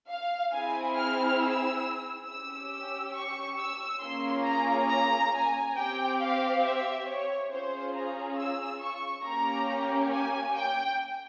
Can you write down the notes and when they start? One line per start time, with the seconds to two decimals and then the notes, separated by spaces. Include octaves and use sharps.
0.10 F5
0.53 C4 E4 G#4 G#5
0.97 F6
1.41 E6
2.27 C#4 G4 E6
2.71 E6
3.15 C#6
3.59 E6
4.01 A#3 C#4 F4 G#4 C6
4.45 A#5
4.89 A#5
5.33 G#5
5.76 C4 G4 G5
6.20 F5
6.64 E5
7.07 C#5
7.51 C#4 F4 G#4 C5
7.94 A#5
8.37 E6
8.81 C#6
9.24 A#3 C#4 G4 A#5
10.11 G#5
10.55 G5